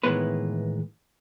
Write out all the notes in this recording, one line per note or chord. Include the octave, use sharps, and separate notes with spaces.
A2 D#3 E3 G#3 B3 B4